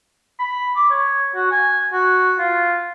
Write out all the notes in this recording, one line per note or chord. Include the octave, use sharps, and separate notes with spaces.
B5
D6
C#5
F#4
G#5
F#4
F4